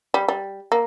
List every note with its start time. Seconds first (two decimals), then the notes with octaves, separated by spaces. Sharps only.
0.14 G3
0.28 G3
0.72 A#3